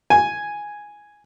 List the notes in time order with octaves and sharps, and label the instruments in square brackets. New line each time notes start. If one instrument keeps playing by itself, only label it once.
[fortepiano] G#5